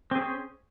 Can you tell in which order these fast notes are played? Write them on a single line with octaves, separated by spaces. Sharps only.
C4 G#4 C#4